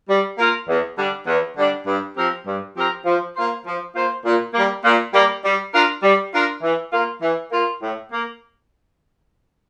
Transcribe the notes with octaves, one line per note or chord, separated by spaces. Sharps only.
G3
A#3 F4 A#4
E2
D3 G3 D4
E2
D3 G3 D4
G2
F3 C4 G4 A#4
G2
F3 C4 G4 A#4
F3
A#3 F4 C5
F3
A#3 F4 C5
A#2
G3 A#3
A#2
G3 A#3
G3
D4 F4 A#4
G3
D4 F4 A#4
E3
A#3 F4
E3
A#3 F4
A2
A#3